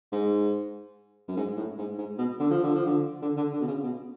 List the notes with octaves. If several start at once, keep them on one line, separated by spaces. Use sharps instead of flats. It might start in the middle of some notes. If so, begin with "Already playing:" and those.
G#2
F#2
G#2
A2
G#2
G#2
B2
D3
F3
D3
F3
D3
D3
D3
D3
B2
C#3
B2